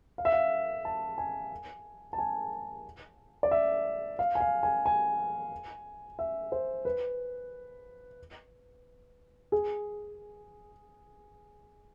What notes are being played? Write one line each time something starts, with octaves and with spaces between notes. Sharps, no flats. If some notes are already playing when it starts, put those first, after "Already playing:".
F5
E5
F5
A5
G#5
A5
G#5
D5
E5
F5
G#5
F5
G#5
G#5
E5
C5
B4
G#4